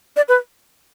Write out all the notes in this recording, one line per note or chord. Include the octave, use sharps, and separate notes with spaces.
D5
B4